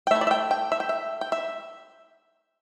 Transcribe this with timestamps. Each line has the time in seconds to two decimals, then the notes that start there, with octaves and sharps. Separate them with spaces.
0.07 G5
0.11 A3 E5
0.15 E4
0.21 D5
0.27 E5
0.31 G5
0.51 G5
0.72 E5
0.80 G5
0.89 E5
1.21 G5
1.32 E5